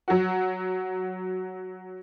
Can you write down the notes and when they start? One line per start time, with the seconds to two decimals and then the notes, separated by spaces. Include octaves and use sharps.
0.08 F#3 F#4